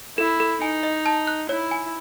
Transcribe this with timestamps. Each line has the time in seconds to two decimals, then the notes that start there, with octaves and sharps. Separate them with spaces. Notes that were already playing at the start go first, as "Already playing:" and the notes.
0.18 E4 A4
0.40 A4
0.61 D#4 G#5
0.83 D#5
1.06 A5
1.27 F#6
1.49 E4 C#5
1.71 G#5